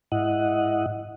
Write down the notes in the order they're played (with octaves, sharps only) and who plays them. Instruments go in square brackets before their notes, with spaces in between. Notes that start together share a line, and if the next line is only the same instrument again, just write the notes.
[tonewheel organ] G#2 E4 D#5 F#5